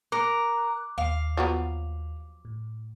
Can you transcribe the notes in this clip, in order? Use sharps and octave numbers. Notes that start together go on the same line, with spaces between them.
A#4 D6 F#6
D#2 F5
F3 F#3 B3
A2